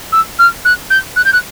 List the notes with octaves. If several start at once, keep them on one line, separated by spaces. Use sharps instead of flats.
E6
F6
F#6
G6
F#6
G6
F#6